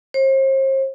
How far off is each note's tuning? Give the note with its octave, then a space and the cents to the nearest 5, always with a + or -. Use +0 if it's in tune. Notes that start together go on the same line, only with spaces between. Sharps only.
C5 +40